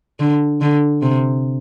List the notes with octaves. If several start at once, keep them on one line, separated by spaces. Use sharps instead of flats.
D3
D3
C3